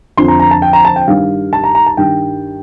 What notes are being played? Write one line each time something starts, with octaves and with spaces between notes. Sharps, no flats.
F2 D3 F3 C6
A#5
A#5
A5
G5
A#5
A5
G5
G2 D#3 G3 F5
A5
A#5
A#5
A5
G2 D#3 G3 G5